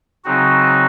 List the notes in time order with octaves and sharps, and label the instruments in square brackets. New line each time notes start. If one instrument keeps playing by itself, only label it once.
[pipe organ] C#3 F#3 C4 D#4 F#4